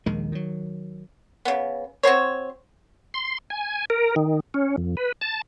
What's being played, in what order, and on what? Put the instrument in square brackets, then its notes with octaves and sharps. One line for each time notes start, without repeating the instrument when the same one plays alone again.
[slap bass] A#1 D#2 D#3 G#3
D#3 F#3
[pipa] C#3 B3
C4 F#4 C5 C#5
[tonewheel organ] C6
G#5
A#4
D#3
C#4
F2
B4
A5